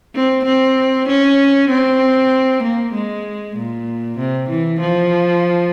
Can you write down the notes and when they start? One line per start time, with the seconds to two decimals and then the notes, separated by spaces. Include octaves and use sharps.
0.15 C4
0.45 C4
1.09 C#4
1.70 C4
2.63 A#3
2.94 G#3
3.56 A#2
4.19 C3
4.50 E3
4.80 F3